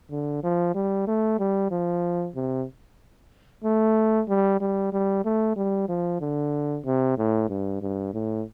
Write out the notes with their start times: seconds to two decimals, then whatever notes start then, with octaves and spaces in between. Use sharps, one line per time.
0.11 D3
0.44 F3
0.75 G3
1.07 A3
1.39 G3
1.71 F3
2.36 C3
3.64 A3
4.29 G3
4.61 G3
4.93 G3
5.25 A3
5.56 G3
5.89 F3
6.21 D3
6.85 C3
7.18 A2
7.49 G2
7.82 G2
8.14 A2